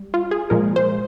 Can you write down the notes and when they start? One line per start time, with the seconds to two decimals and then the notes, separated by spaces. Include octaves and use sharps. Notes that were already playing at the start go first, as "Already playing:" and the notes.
Already playing: G3
0.14 F4
0.31 G#4
0.50 A#2 F3 G#3 A#4
0.76 C5